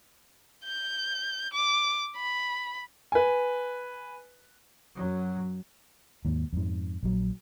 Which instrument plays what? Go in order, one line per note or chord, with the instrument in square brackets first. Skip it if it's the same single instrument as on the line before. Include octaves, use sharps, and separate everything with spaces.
[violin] G6
D6
B5
[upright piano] B4 G#5
[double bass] F#2 F#3
[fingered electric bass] D#2 G#2
F2 G#2
A#1 F#3